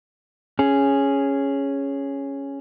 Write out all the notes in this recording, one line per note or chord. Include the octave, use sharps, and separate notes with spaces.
C#4 G#4